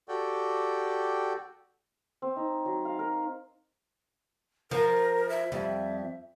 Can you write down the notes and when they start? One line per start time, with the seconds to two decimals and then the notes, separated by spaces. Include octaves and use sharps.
0.08 F#4 G4 A4 D5 G5
2.22 C4
2.36 D#4
2.65 F#3
2.85 F5
2.99 A#4
4.71 F3 A#4
5.29 E5
5.52 F2 G3 E5